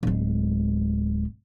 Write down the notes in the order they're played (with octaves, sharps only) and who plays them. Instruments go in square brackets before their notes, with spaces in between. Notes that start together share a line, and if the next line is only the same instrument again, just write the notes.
[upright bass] D1 G#3